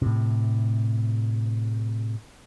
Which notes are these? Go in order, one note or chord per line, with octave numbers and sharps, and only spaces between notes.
A2 C3